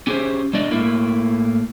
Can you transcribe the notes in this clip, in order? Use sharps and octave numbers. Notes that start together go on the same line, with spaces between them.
C#4 G4 G#4 C5
G#3 D4 D5 D#5
A2 A#3 E4